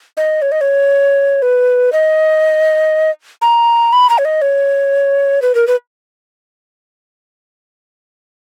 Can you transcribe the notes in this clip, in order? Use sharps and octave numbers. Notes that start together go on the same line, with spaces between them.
D#5
C#5
D#5
C#5
B4
D#5
A#5
B5
A#5
C#5
D#5
C#5
B4
A#4
B4